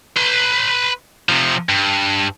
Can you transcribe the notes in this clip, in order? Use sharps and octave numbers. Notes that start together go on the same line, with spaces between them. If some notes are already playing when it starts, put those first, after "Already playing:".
B4 C6
C3 F3
G2